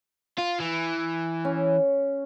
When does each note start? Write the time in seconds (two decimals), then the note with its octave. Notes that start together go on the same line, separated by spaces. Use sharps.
0.38 F4
0.60 E3
1.45 C#4